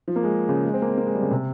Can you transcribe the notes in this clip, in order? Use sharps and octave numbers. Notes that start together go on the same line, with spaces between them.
F3
A#3
G#3
C#3
G#3
C4
A#3
G#3
A#3
G#3
G3
C#3
C3